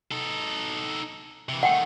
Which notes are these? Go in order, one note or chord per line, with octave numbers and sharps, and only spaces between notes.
D#4 A4
C3 E3
D#3 A3 F#5 G5